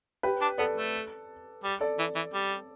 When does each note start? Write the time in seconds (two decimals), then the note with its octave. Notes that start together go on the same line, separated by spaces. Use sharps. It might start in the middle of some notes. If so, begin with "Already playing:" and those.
0.23 G4 B4
0.42 D4
0.58 B3 A4 D5
0.76 A3
1.64 G3
1.81 A4 D5
1.99 E3
2.15 E3
2.34 G3